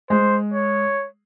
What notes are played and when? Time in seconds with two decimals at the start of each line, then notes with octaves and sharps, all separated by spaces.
0.10 G#3 C5
0.54 C#5